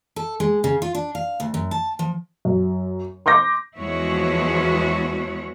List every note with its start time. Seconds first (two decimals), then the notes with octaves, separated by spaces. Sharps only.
0.16 A4
0.40 G#3
0.64 C#3
0.82 F4
0.95 D4
1.15 F5
1.40 D2
1.54 F#2
1.71 A5
1.99 F3
2.45 F#2
3.26 C6 D6 G6 A#6
3.79 E2 F3 G#3 E4 F#4 C#5